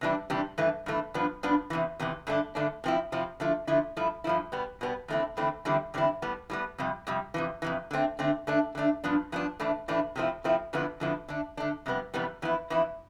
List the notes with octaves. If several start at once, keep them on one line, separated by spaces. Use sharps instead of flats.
C3 E3 G3 D4
C3 E3 G3 D4
G2 E3 A3
G2 E3 A3
G2 F3 B3 D4
G2 F3 B3 D4
E2 C3 E3
E2 C3 E3
G2 D3 A3 D4
G2 D3 A3 D4
C3 F3 C4 E4
C3 F3 C4 E4
D3 F3 A3 E4
D3 F3 A3 E4
G2 F3 A3 E4
G2 F3 A3 E4
B2 G3 B3
B2 G3 B3
E2 D3 A3 C4 E4
E2 D3 A3 C4 E4
E2 D3 G3 C4 E4
E2 D3 G3 C4 E4
A2 G3 B3
A2 G3 B3
F2 C3 G3
F2 C3 G3
F2 C3 E3
F2 C3 E3
D3 A3 C4
D3 A3 C4
D3 A3 D4
D3 A3 D4
G2 F3 B3 D4
G2 F3 B3 D4
A2 E3 A3 D4
A2 E3 A3 D4
C3 F3 A3 C4 E4
C3 F3 A3 C4 E4
F2 D3 F3 B3 E4
F2 D3 F3 B3 E4
D3 A3 D4
D3 A3 D4
F2 C3 G3 B3
F2 C3 E3 G3 B3
F2 E3 B3 E4
F2 E3 B3 E4